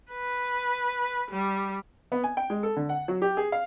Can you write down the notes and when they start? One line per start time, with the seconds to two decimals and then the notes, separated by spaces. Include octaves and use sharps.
0.11 B4
1.31 G3
2.12 B3
2.24 G#5
2.37 G5
2.50 G#3
2.63 A4
2.76 D3
2.89 F#5
3.08 F#3
3.22 G4
3.37 G#4
3.52 F5